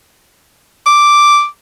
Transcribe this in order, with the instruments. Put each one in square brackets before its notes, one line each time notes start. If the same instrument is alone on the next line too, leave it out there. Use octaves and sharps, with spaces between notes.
[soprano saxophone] D6